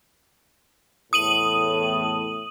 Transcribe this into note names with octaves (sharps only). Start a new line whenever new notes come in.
E2 A2 D#6 D#7 F#7